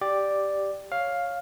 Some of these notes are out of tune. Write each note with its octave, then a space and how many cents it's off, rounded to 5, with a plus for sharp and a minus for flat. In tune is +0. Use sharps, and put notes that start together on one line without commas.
G4 +0 D5 +5
C#5 +0 F5 +5